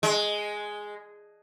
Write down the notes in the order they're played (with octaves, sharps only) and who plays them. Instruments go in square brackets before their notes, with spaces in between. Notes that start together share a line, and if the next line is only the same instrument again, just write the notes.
[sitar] G#3